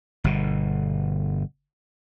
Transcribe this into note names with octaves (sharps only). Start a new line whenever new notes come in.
G1 B2